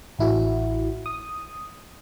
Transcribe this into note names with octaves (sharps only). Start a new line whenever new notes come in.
A1 E4 F#4
D#6